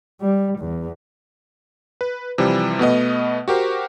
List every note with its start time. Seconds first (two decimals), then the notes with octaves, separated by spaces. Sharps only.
0.21 G3
0.59 E2
2.01 B4
2.38 C3 E3 F3 G3
2.79 B2 A3 B3 D#5
3.48 F#4 G4 A#4 C5